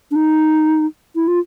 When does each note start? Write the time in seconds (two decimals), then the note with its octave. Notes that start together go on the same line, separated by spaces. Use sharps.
0.11 D4
0.16 D#4
1.15 E4
1.28 F4